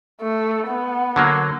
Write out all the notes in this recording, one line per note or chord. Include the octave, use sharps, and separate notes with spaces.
A3
B3
D3 F#3 A#3